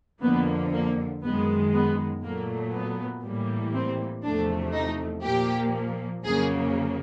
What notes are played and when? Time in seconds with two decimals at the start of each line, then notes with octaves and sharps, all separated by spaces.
0.23 F2 D3 F3 A#3 B3
0.73 A#3
1.23 F#2 D#3 G#3 B3
1.74 B3
2.24 A#2 F#3 A3 A#3
2.74 B3
3.24 A2 E3 G3 A#3
3.74 C4
4.25 E2 C3 F3 A3 D4
4.74 D#4
5.24 A#2 F3 A#3 G4
6.25 F2 C#3 F#3 A#3 G#4